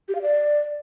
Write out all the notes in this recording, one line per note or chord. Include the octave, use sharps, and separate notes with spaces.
G4
F5
D5